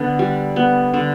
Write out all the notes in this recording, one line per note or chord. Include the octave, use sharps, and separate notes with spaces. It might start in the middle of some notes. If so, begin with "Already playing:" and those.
Already playing: D3 B3
G3
B3
D3